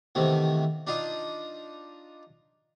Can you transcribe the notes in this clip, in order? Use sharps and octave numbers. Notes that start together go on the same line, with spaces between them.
E2 C3 D#3 A3
D4 D#4 F4 D#5